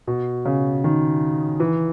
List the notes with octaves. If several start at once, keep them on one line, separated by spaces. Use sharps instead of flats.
B2
C#3
D#3
E3